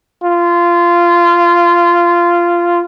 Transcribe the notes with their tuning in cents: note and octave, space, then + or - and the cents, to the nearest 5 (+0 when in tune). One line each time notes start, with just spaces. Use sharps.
F4 -15